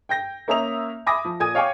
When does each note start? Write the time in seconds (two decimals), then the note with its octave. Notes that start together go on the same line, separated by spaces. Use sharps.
0.09 G5 G6 A#6
0.48 A#3 C#4 E5 A#5 D#6 F7
1.06 E5 G#5 B5 D6 D#6 A#6
1.25 F3
1.40 A#2 G#5 D#6 G#6 D#7
1.55 C#5 F5 G5 G#5 C#6 D6